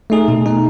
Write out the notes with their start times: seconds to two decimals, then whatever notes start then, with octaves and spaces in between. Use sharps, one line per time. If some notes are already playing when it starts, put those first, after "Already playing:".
0.10 A3 D#4 G#4
0.28 B2
0.46 A3 D#4